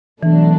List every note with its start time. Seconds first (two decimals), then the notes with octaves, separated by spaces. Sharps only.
0.23 B2 E3 F#3 A3 D4